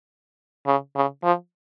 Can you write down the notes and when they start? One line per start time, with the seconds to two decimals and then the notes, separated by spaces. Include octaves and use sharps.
0.66 C#3
0.96 C#3
1.23 F3